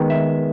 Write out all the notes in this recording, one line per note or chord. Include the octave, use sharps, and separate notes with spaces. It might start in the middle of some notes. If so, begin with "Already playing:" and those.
Already playing: D#3 G#3 B3
E5